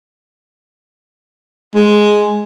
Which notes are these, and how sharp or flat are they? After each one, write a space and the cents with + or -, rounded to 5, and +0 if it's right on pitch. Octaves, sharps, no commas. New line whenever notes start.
G#3 +5